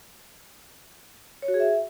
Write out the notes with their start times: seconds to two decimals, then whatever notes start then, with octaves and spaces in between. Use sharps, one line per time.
1.42 C#5
1.48 F#4
1.54 G#4
1.60 E5